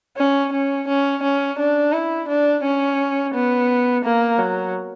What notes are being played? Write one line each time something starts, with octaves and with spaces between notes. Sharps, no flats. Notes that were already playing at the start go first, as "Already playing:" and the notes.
C#4
C#4
C#4
C#4
D4
E4
D4
C#4
B3
A#3
F#3